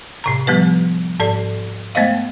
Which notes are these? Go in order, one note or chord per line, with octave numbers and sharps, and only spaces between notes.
A2 C3 A#5
F3 G3 B3 G4 B4
G#2 A4 D5
G#3 A3 B3 C5 D#5 F5